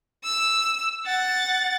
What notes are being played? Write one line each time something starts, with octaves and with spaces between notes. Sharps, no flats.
E6
F#5 A6